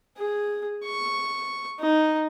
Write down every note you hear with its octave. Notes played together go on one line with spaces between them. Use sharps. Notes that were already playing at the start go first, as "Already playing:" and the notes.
G#4
C#6
D#4